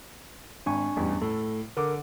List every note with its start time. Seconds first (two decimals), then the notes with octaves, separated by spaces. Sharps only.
0.66 G#1 D4 G#5 C#6
0.96 A1 E2 G2
1.22 A2 A4
1.77 D3 A#4 D6